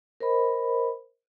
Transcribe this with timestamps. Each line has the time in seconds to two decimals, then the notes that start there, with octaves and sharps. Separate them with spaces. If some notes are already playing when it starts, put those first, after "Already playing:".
0.20 A#4 C5 D#5 B5